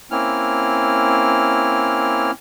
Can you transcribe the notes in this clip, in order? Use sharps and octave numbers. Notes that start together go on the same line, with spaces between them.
A#3 C4 C#4 E4 F6